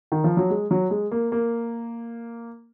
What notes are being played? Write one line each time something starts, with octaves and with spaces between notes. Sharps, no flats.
D#3
F3
F#3
G#3
F#3
G#3
A#3
A#3